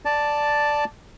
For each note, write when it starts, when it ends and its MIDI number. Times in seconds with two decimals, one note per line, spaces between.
0.05 0.84 74
0.05 0.84 81